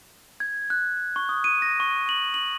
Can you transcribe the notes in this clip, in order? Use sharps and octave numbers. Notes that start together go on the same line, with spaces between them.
G#6
F#6
C#6
D#6
D#7
A#6
C#6
F#7
F#7